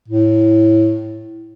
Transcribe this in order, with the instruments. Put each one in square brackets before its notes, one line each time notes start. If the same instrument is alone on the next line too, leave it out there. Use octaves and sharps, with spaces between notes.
[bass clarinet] A2